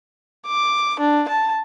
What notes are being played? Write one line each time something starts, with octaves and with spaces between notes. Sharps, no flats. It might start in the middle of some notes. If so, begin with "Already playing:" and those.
D6
D4
A5